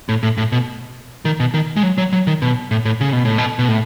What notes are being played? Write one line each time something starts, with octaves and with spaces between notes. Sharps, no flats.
A2
A2
A2
B2
D#3
B2
D#3
G#3
F#3
F#3
F#3
D#3
B2
A2
A2
C#3
B2
A2
B2
B2
A2